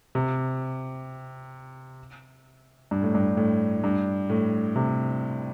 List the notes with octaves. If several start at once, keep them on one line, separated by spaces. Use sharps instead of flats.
C3
G2
A2
G2
A2
G2
A2
C3